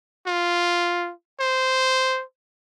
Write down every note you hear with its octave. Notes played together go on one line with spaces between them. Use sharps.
F4
C5